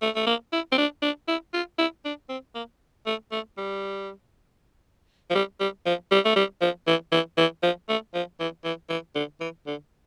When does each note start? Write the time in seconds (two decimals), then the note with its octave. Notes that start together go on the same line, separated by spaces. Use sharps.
0.02 A3
0.15 A3
0.26 A#3
0.52 E4
0.72 C4
0.78 D4
1.02 D4
1.28 E4
1.54 F4
1.78 E4
2.05 D4
2.29 C4
2.55 A#3
3.07 A3
3.32 A3
3.57 G3
5.30 F3
5.35 G3
5.60 G3
5.86 F3
6.11 G3
6.25 A3
6.36 G3
6.61 F3
6.87 E3
7.12 E3
7.38 E3
7.63 F3
7.89 A3
8.14 F3
8.40 E3
8.64 E3
8.89 E3
9.15 D3
9.40 E3
9.67 D3